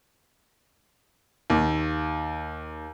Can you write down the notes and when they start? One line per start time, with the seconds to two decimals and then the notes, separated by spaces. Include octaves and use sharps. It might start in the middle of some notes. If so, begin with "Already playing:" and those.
1.50 D#2